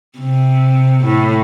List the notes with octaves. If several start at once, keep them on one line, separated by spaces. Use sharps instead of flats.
C3
A2